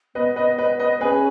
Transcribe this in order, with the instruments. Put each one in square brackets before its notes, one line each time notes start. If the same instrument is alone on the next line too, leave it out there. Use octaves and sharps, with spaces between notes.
[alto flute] B3 [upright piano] B4 D#5
[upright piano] B4 D#5
B4 D#5
B4 D#5
[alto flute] C#4 [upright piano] G#4 B4